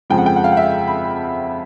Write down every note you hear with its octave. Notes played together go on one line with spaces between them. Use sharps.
F2 C#3 F3 G#3 G5
F#5
G5
F#5
F5
F#5
E5
F5
B5